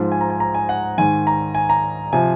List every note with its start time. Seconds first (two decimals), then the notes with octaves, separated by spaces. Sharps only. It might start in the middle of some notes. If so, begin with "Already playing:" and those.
Already playing: G#2 F3
0.12 G#5
0.21 A#5
0.30 G#5
0.40 A#5
0.54 G#5
0.69 F#5
0.98 G#2 D#3 G#5
1.27 A#5
1.55 G#5
1.69 A#5
2.13 C3 F3 G#5